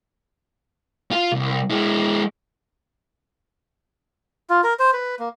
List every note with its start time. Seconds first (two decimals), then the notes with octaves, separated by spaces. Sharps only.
1.11 F4
1.32 C2
1.70 G#3 E4
4.50 F4
4.64 A#4
4.79 C5
4.93 B4
5.19 A#3